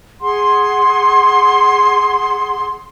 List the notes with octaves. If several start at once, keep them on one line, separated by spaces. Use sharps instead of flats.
G#4 F#5 C6